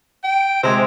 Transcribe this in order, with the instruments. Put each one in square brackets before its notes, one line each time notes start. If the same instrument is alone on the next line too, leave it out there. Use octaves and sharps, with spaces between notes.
[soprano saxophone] G5
[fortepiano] C3 G#3 [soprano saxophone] C5